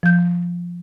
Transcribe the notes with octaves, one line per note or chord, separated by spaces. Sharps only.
F3 G6